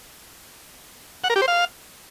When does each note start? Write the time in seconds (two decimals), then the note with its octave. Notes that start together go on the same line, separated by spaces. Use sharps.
1.24 F#5
1.30 A#4
1.36 G4
1.42 C5
1.48 F5